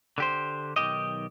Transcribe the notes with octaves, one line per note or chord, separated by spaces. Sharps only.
D3 G4 C5
B1 B2 D#3 G4 D#5